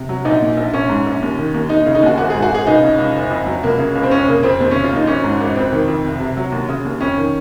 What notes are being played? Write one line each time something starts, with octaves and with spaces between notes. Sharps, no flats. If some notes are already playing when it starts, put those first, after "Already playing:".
Already playing: C3
F#3
A#1 D#4
A#2
A#1
A#1 C#4
G#2
A#1
D#2
D#3
D#2
D#2 D#4
D#4
C#3
D#4
D#2 F#4
G#1 F#4
G#2 G#4
F#4
G#1 G#4
C#2 D#4
C#3
C#2
F#1
F2
F#3
C#2 A#3
C#3
C#2
C4
F2 C#4
C#3 A#3
F2 C4
D#2 C4
C#3 C#4
F4
D#2 D#4
G#1 C#4
G#2
G#1
F2 C4
D#3
F2
C2
C3
F#3
D#2
C#3
D#2
F2 C#4
D#3